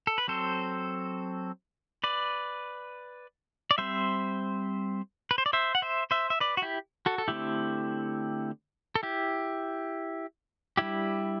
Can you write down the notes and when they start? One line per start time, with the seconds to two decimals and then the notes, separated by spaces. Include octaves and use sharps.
0.07 A4
0.18 B4
0.28 F#3 C4 A4 C5
2.04 B4 D5
3.71 D5
3.78 G3 C4 C5 E5
5.31 B4
5.38 C5
5.46 D5
5.53 C5 E5
5.75 F#5
5.82 C5 E5
6.11 C5 E5
6.30 E5
6.40 B4 D5
6.57 F#4
6.62 E4 G4
7.06 F#4 A4
7.18 A4
7.28 D3 A3 C4 E4 G4
8.95 A4
9.03 E4 G4
10.77 G3 D4 E4 G4